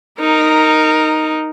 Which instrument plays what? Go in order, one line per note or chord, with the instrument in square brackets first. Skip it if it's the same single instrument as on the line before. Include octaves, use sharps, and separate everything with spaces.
[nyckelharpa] D#4 [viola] A#4